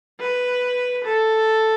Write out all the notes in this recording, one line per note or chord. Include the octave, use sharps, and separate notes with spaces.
B4
A4